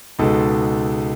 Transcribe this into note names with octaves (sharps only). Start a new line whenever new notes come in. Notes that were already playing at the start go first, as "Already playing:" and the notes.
C#2 B2 G#3 D#4 A4